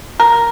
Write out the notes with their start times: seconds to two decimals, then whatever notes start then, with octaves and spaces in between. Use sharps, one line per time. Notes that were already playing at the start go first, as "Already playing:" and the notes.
0.20 A#4